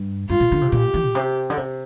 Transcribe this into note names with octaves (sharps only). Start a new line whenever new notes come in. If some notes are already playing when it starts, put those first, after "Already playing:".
Already playing: G2
G2 F4
A#2
D3
C3
A#2 G4
E3
A#2
C3
D3
C3